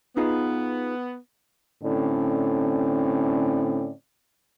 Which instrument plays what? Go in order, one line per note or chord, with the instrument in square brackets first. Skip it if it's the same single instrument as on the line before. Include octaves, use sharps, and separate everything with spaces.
[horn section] B3 [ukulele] D#4 F4 G#4
[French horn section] A2 D3 C4 C#4 D5